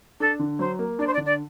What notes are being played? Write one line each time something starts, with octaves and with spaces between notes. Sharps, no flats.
D4 A4
D3
F#3 C5
A#3
D4 D5
C5
D5
D3
D5